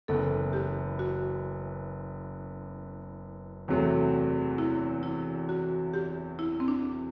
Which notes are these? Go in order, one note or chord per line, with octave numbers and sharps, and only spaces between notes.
F#1 F#2 E3 B3 A4
G4
F#4
E2 C3 F#3 A3
E4
E4
F#4
G4
E4
C4
D4